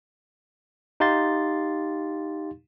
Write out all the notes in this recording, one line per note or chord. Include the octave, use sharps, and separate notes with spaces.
D#4 G4 F5 C6 A6